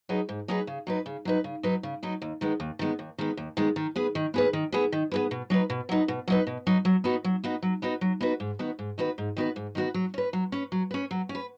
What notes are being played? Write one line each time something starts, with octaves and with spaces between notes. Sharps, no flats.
F#3 D#4 G#4 B4
G#2
F#3 D#4 G#4 B4
C#3
F#3 D#4 B4
C#3
F#3 D#4 B4
C#3
F#3 D#4 B4
C#3
F#3 D#4 B4
D#2
D#3 G#3 B3
D#2
D#3 G#3 B3
D#2
D#3 G#3 B3
D#2
D#3 G#3 B3
D#3
B3 G#4 B4
D#3
B3 G#4 B4
D#3
B3 G#4 B4
D#3
B3 G#4 B4
B2
F#3 D#4 B4
B2
F#3 D#4 B4
B2
F#3 D#4 B4
B2
F#3 D#4 B4
F#3
B3 D#4 F#4 B4
F#3
B3 D#4 F#4 B4
F#3
B3 D#4 F#4 B4
F#3
B3 D#4 F#4 B4
G#2
D#3 B3 F#4 B4
G#2
D#3 B3 F#4 B4
G#2
D#3 B3 F#4 B4
G#2
D#3 B3 F#4 B4
F#3
C#4 B4
F#3
C#4 B4
F#3
C#4 B4
F#3
C#4
B4